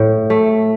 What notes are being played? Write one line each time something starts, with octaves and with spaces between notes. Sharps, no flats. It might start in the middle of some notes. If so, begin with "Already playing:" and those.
Already playing: A2
A3